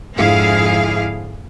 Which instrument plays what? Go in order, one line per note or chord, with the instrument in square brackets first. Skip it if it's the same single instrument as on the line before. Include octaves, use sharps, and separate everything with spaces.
[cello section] F2 G#2 D3 E4 G#4 F5